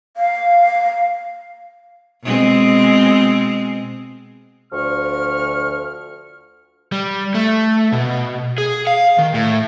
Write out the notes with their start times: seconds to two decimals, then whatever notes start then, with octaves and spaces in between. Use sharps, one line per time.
0.17 F5
2.23 B2 G#3 C4
4.72 D2 F3 C#6 F6
6.92 G3
7.34 A3
7.92 B2
8.58 G#4
8.87 F5
9.19 D#3
9.34 A2